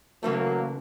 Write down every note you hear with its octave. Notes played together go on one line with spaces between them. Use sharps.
C#3 E3 F#3 A3 A#3